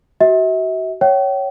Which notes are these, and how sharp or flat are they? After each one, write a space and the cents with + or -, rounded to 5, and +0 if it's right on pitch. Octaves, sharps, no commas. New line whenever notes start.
F#4 +30 E5 -40
C#5 +0 E5 +45 G5 -40